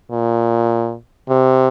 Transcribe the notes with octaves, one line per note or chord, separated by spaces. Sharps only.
A#2
C3